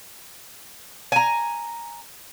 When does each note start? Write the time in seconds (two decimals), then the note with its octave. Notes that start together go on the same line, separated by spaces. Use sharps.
1.12 G#5 A#5